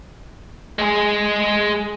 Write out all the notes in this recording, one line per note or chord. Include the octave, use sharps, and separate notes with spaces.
G#3 G#4